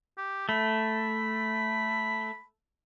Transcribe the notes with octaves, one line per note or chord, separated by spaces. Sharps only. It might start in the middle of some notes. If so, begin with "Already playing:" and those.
G4
A3 B5